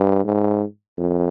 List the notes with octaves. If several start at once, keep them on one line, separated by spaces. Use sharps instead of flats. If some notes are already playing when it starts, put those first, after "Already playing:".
Already playing: G2
G#2
F2